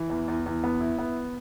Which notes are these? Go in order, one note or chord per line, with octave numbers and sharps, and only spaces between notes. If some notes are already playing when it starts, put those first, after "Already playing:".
Already playing: E3
E2
E2
E2
B3
E4
B3